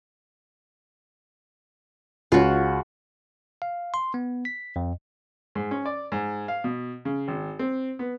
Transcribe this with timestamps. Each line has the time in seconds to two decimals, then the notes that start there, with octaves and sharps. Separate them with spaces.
2.32 C#2 C#4 F4 F#4
3.62 F5
3.94 C6
4.14 B3
4.45 B6
4.76 F2
5.55 G#2
5.71 C#4
5.86 D5
6.12 G#2
6.48 F5
6.64 B2
7.05 C#3
7.28 G#1
7.59 C4
7.99 B3